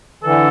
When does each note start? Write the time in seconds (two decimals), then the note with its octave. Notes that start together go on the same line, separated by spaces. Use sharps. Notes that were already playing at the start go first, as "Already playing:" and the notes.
0.23 D3 E3 A4